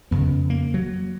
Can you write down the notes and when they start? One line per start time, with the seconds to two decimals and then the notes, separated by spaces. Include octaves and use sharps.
0.11 F2 C#3 B3
0.50 A#3
0.74 F#3